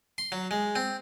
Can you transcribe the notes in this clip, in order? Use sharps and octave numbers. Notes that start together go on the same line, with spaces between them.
C6
F#3
G#3
C4